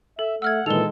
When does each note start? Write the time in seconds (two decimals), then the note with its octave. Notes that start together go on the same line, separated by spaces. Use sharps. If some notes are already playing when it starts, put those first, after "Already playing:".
0.19 A4 E5
0.42 A3 F#5 E6 F6 G#6
0.66 A#2 D#3 E3 G#3 A4 F7 G7